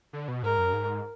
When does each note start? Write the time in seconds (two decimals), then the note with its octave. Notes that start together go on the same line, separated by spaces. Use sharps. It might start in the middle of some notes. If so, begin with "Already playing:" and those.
0.13 D3
0.28 B2
0.43 G#2 A#4
0.58 F#2
0.73 G#2